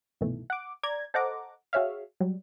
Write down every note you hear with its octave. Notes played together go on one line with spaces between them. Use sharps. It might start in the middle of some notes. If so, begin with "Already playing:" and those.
C2 G2 B2 D#3 E3 A3
F#5 D6
D5 A#5 G#6
A4 C5 D#5 F#5 A#5 D6
F#4 G#4 C#5 E5 F5
F#3 G3